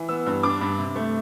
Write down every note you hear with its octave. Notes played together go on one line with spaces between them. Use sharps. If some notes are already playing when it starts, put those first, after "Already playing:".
Already playing: E3
B3 E6
G2
D4 D6
G2
C3
A3